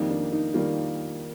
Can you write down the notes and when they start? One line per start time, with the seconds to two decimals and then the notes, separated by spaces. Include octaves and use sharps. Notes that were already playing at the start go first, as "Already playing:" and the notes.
Already playing: F2 D#3 G3 A#3 D#4
0.10 D4
0.32 D#4
0.54 D#3 G3 A#3 F4